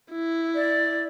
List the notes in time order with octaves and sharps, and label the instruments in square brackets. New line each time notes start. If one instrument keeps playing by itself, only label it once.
[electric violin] E4
[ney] D5